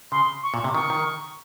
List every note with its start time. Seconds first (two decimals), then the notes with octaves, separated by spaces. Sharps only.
0.11 C#3 C6
0.43 C#6
0.54 A#2
0.64 C3
0.75 D#3 C#6
0.90 D#3